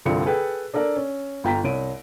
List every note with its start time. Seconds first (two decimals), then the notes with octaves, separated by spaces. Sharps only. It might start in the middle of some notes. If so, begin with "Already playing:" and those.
0.05 C2 G2 D3 F3 C4 C#7
0.26 G#4 A4 B4 G5
0.74 D4 A4 A#4 D5
0.96 C#4
1.44 G1 F4 G5 A#5 B6
1.64 C2 C#5 D7 D#7